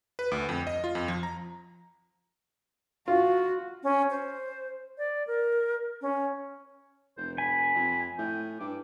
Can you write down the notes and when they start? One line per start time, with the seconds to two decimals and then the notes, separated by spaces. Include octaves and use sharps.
0.19 B4
0.31 D2
0.49 F2
0.67 D#5
0.84 F4
0.95 F2
1.08 F3
1.23 A#5
3.08 F4 F#4
3.83 C#4
4.10 C5
4.98 D5
5.27 A#4
6.01 C#4
7.17 F1 C5
7.38 G#5 B5
7.75 F2
8.18 A2 G5
8.60 G2 D6